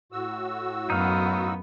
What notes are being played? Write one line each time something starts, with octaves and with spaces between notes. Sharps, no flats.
A2 F#4 E6
F#2 B3 D#4 F5